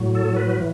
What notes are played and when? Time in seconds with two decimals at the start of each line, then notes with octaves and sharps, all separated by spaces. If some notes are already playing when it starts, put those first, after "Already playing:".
Already playing: A2 F#3
0.15 A4
0.37 B4
0.58 E3